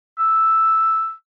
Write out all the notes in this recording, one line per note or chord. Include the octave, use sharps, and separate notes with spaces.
E6